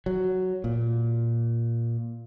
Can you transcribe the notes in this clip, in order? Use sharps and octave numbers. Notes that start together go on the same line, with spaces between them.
F#3
A#2